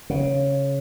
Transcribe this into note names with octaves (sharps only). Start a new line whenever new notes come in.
C#3